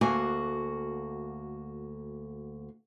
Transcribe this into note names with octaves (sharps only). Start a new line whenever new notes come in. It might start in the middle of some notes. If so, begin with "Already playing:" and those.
D2 A#3 F#4 G#5